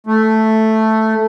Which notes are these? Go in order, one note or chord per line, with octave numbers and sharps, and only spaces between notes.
A3